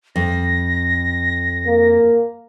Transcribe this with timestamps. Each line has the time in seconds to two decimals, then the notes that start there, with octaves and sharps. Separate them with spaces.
0.16 F2 A#6
1.67 A#3